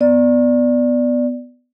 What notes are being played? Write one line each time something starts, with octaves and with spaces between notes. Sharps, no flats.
B3 D5